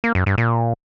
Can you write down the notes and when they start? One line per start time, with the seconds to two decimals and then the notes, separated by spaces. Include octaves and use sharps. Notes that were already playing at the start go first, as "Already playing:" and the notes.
0.04 A#3
0.15 F#2
0.26 G2
0.38 A#2